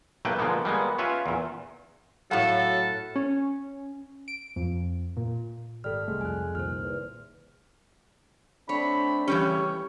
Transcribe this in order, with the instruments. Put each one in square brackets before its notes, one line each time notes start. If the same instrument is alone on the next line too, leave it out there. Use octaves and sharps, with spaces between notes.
[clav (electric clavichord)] B1 A3 A#3 B4 G5
D3 F3 G#3 A#3 B3
G3 G#3 A#3 B3
C#4 F4 B4 E5
E2 A#2
[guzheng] A2 A3 [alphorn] F#3 [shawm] A4 [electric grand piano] F5 F#5 B5
[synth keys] C#4
D7
F2
A#2
[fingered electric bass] G#1 [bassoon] G3 [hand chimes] A4 F6
[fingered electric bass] C2 [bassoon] G#3 [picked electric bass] A3
[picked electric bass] F2 [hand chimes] G#5 F#6
[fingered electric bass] C2 A#2 D#3 [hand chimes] C5 F6
[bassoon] E2
[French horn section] A3 C4 D4 [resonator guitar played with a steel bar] C#5 [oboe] B5
[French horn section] C#3 A3 G4 [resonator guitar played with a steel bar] E3 G3 C#4 [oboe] C#5